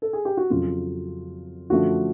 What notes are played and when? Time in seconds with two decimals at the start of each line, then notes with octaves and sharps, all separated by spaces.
0.02 A4
0.13 G#4
0.25 G4
0.37 F#4
0.50 F2 C#3 F#3 F4
1.70 F#2 D3 F3 A3 F#4